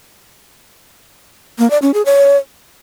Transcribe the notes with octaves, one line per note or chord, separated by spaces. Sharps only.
A#3
D5
C#4
G#4
C#5